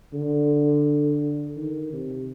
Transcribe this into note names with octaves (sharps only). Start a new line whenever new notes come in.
D3
D#3
C3